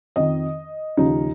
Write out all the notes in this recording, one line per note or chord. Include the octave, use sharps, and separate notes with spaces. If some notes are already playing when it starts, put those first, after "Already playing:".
F2 D#3 D#5
D#2 C#3 F3 D#4